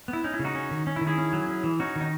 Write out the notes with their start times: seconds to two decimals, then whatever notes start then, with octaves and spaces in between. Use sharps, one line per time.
0.08 B3
0.13 E4
0.24 C#4 D#4
0.34 E4
0.39 C#3
0.45 D#4 F#4
0.55 C#4
0.71 D#3
0.87 C#4
0.96 E4
1.01 D#3
1.07 E4 G#4
1.18 C#4
1.33 F#3
1.48 C#4
1.64 E3
1.80 C#4 D#4 F#4
1.96 D#3 D#4